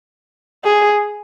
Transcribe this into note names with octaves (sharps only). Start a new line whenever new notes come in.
G#4